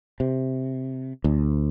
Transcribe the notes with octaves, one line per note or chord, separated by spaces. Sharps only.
C3
D2